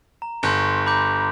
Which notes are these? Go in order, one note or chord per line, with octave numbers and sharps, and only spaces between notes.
A#5
G1 C6 C#6 G6 A#6
A#5 B5 D6 G6